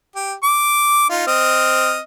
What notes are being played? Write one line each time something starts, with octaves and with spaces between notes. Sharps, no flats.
G4
D6
D#4 F4
C4 D#5 F6